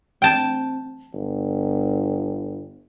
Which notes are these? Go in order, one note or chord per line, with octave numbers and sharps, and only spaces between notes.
C4 G5 A5
G1